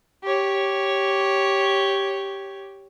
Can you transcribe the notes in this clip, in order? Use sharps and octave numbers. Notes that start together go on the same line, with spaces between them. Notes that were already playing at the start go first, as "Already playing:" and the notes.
G4 C#5